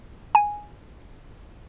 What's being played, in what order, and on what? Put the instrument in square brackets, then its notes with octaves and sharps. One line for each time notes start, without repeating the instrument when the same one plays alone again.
[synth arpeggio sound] G#5